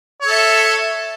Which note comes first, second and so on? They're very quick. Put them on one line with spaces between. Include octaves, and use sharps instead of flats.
C#5 A4 E5